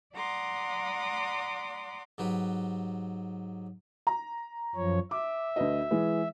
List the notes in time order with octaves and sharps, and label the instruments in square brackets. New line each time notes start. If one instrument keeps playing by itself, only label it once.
[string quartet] D5 F#5 A#5 C6 D6 D#6
[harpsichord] G#2 F#3 G4 B4
[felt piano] A#5
[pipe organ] F#2 F3 C#5
[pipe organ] E5 [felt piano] D6
[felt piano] D2 B4 D#5
E3 G#3